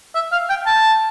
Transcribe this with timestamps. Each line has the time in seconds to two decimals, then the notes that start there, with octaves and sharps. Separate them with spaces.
0.15 E5
0.32 F5
0.50 G5
0.66 A5